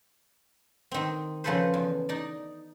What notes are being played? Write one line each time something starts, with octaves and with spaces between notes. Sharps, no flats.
D#3 C4
C#3 F3 C#4 A4 B4 C5
E2
D#4 D5